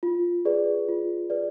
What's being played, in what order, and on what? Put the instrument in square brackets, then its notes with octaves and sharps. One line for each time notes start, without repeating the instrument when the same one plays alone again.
[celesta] F4
G#4 B4 D5
F4
G#4 B4 D5